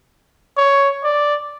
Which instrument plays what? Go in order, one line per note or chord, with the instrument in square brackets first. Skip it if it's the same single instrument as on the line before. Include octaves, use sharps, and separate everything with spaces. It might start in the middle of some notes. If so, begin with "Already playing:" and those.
[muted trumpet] C#5
D5